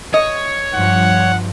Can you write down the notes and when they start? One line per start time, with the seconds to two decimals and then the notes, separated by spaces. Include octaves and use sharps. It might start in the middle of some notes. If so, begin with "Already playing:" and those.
0.14 C#5 D#5
0.73 G2 F3 F#5